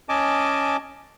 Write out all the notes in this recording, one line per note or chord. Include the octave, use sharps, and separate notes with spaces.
C#4 D#5 G#5 A5 D6